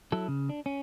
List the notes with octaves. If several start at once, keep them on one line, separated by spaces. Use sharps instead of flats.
F#3 E4 A4
C#3
D4
C#4